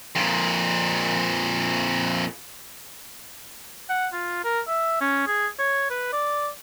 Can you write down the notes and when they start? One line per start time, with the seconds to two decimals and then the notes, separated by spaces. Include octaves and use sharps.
0.16 F2 A#2
3.90 F#5
4.13 F4
4.44 A#4
4.68 E5
5.01 C#4
5.27 G#4
5.59 C#5
5.90 B4
6.13 D5